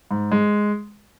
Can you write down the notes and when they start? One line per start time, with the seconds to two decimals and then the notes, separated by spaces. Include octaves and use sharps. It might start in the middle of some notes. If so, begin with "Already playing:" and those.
0.11 G#2
0.31 G#3